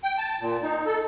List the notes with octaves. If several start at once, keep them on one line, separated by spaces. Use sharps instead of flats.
G5
A5
A#2
D#4
A4